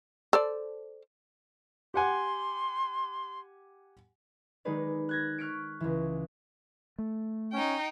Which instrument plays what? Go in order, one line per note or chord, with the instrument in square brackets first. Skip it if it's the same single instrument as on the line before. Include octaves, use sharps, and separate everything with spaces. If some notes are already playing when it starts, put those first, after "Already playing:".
[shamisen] A4 C5 D5
[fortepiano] G4 F#5 G#5 [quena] C6
[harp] D#3 G#3 D#4 G#4 B4 D5
F#6 G#6 A#6
C#6 F6 F#6 B6 C#7 D7
C#2 E3
[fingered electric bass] A3
[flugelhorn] C#4 [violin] D#4 G5